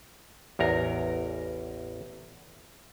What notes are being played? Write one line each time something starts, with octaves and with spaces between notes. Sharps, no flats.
A1 E2 A#4 A#5